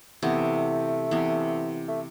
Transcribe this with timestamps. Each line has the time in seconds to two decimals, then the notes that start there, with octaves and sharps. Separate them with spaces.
0.23 C3 E3 A3 B3
1.11 C3 E3 B3
1.88 A3